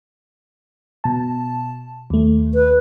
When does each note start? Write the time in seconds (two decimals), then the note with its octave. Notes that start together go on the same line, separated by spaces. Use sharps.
1.04 B2 A5
2.10 D#2 A3
2.54 B4